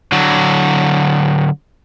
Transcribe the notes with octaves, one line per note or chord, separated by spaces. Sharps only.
D3 F#3